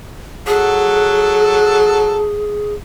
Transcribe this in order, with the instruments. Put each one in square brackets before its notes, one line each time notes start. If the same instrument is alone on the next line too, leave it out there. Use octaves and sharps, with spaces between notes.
[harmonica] F#3 A4 F#5 [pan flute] G#4